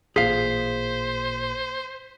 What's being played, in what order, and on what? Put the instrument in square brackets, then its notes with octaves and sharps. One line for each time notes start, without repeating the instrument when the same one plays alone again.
[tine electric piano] A1 A#2 [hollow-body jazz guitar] G#4 F5 [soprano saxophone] C5 [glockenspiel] B6